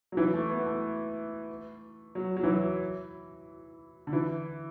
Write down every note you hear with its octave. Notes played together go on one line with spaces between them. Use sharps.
F#3
E3
A3
B3
A3
F#3
F#3
E3
F#3
D3
E3